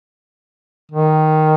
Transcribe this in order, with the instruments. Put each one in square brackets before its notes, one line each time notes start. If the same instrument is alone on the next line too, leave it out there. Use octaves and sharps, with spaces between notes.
[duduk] D#3